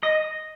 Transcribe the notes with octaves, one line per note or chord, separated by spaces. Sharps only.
D#5